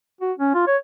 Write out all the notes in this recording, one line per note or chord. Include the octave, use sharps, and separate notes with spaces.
F#4
C#4
F4
C#5